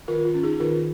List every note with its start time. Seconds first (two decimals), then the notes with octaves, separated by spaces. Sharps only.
0.08 D#3 F4 A#4
0.25 F4
0.34 C#4
0.43 D#4 G#4
0.60 D#3 F4 A#4